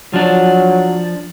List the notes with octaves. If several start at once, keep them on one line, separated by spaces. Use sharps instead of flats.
F3 F#3 D4